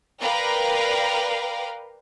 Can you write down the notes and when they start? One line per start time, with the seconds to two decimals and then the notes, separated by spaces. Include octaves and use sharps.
0.21 A#4 B4 D5 F5 G5 A#5